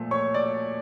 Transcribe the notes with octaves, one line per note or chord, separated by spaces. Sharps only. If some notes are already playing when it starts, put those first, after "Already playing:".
Already playing: A#2 F3 A3
C#5 C#6
D5 D6